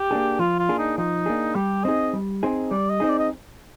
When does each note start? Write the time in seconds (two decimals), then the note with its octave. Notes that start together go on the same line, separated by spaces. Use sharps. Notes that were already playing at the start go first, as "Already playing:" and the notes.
Already playing: G4
0.11 A#3 D4 G#4
0.39 F3 F4
0.59 F4
0.69 A#3 D4 G#4
0.78 D#4
0.98 F3 D#4
1.26 A#3 D4 G#4
1.55 G3 G4
1.84 C4 D#4 G#4 D#5
2.13 G3
2.43 C4 D#4 G#4
2.71 G3 D5
2.90 D#5
3.00 C4 D#4 G#4
3.09 D5
3.19 D#5